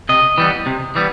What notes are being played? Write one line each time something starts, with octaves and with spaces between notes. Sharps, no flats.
C3 D#5
E3 G3 B3
C3
E3 G3 B3